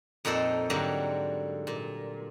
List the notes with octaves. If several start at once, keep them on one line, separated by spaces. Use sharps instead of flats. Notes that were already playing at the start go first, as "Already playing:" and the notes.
F2 A#2 D#4 A4 C5
G#2 D3 F#3 G3 A#3
A#2